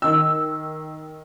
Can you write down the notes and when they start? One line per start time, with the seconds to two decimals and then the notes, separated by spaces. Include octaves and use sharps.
0.02 D#3 E6